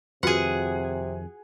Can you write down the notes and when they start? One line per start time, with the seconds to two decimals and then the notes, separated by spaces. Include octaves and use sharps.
0.23 F2 C3 D#3 F4 F#4 G#4 B4 F#5